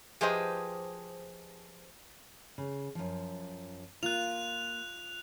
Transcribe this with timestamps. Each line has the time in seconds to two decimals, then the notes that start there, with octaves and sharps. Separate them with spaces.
0.21 F3 G4 G#4 B4 C5 D#5
2.58 C#3
2.95 F#2 F3
4.03 A#3 F4 F#6 F7